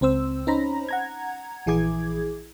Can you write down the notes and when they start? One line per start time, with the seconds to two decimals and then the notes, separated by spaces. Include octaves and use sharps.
0.01 C#2 C4 C5 E6
0.47 C#4 D#4 C5 A#5 B5 A#6
0.89 F#5 A#5 G#6
1.66 A#1 E3 E4 G#4 D6 G#6